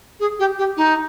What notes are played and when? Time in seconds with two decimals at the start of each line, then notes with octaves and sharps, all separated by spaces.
0.20 G#4
0.39 G4
0.58 G4
0.77 D#4